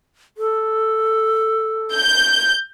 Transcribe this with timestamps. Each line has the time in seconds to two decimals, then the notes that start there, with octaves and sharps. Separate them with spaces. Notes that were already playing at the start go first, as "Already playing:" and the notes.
0.37 A4
1.94 G6